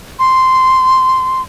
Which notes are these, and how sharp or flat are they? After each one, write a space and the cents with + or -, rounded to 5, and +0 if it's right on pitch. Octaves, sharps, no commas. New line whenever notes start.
C6 -10